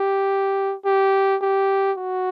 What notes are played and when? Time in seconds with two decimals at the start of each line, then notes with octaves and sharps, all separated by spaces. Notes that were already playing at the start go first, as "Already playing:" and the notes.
Already playing: G4
0.85 G4
1.41 G4
1.98 F#4